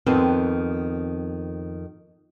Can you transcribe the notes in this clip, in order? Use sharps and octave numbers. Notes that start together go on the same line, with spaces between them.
F2 D#3 B3 C4